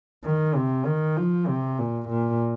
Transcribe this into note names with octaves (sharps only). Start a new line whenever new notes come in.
D#3
C3
D#3
F3
C3
A#2
A#2